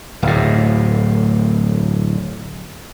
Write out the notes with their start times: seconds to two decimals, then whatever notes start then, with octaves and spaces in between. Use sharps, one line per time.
0.22 D1 A2